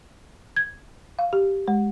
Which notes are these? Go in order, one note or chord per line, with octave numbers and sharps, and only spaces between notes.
G#6
F5
G4
G#3